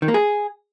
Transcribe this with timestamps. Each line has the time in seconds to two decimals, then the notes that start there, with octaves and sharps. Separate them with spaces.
0.02 D#3
0.08 A#3
0.14 G#4